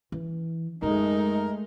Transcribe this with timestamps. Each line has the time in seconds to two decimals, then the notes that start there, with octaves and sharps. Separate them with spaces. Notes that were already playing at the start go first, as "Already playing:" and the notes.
0.12 E3
0.82 F#2 G#3 A3 D#4 A#4